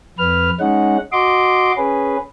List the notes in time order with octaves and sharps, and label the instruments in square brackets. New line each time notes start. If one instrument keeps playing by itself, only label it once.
[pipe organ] F2 B4 F6
G#3 C#4 D#4 F#5
F#4 D#5 C6 D6
C#4 G#4 B4